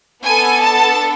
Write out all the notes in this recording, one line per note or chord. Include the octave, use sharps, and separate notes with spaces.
B3 D4 A4 G#5
A5